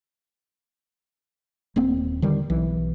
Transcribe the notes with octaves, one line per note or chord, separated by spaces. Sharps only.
D#1 A#3 C4
D3 D#3 G3
B1 E3